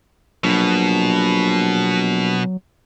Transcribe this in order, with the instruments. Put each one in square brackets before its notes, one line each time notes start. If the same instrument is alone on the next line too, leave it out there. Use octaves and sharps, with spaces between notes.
[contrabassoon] A#1 [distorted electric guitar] B2 [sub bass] F#3